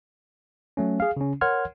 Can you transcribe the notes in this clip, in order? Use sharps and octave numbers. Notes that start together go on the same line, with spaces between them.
F#3 A3 C#4
G#4 F5
C#3 C#4
A#4 C#5 F#5 C6 F6 G#6